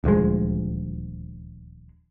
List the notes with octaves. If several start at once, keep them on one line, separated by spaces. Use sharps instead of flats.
D#1 D2 F3 G#3